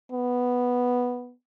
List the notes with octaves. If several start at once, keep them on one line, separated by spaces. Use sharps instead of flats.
B3